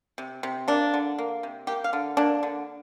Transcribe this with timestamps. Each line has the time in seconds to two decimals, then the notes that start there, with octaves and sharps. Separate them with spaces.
0.18 C3
0.43 C3
0.68 A#3 D4
0.94 D3
1.19 A#3
1.43 C3
1.67 A#3 G4
1.84 F5
1.93 D3
2.17 A#3 D4
2.43 D3